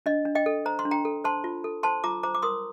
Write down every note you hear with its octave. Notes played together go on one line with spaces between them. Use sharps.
D4 D#5
D4
D#5 G5
A4
C5 A#5
C6
D4
G5 A#5
A4
C5 A5 C6
F4
A4
C5 A5 C6
F4 A#5 D6
C5 A#5 D6
D6
A#4 C6 D#6